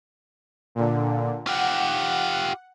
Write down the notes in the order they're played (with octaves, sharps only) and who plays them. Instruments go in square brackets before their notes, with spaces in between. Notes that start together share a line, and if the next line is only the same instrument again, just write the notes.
[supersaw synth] A#2 D3
[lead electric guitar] F4 G4 [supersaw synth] F#5